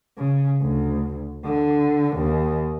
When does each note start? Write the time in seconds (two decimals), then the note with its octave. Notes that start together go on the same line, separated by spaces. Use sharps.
0.18 C#3
0.61 D2
1.45 D3
2.17 D#2